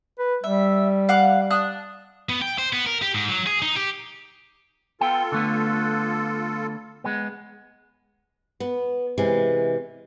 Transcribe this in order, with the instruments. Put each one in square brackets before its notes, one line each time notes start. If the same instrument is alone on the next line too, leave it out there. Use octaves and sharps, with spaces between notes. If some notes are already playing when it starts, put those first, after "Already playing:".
[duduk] B4
[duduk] G3 [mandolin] E5
[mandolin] F5 F#5 D6
D4 D#6 F#6
[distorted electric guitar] B3
G5
C5
B3
A#4
G4
G#2
F#3
G#4
D#4
G4
[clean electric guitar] B3 G5 [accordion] F4 A4
[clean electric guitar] D3 A3 B3
G#3 B3
[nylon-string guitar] B3
C3 E3 G#3